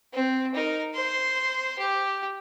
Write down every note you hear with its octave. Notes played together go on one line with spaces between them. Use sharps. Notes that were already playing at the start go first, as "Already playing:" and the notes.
C4
D#4 A#4
C5 C6
G4